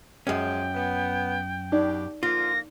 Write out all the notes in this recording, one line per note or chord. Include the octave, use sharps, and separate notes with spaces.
F#2 F3 G#3 C#4 G5
B3
B2 D4 D#4 G4 D5
D3 F3 A#3 F4 A#6